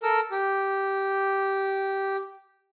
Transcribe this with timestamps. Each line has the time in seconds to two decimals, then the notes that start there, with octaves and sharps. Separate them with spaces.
0.03 A4 A#4 E6
0.31 G4